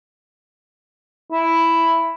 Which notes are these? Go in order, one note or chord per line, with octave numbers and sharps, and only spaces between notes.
E4